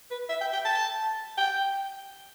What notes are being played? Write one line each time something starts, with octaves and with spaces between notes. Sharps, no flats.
B4
E5
G5
G5
A5
G5